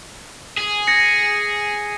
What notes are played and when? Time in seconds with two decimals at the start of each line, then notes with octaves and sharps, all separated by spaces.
0.58 G#4
0.87 G#6 A#6 C#7